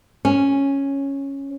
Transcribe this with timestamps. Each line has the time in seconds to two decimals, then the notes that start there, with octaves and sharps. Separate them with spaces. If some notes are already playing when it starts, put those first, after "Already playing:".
0.25 C#4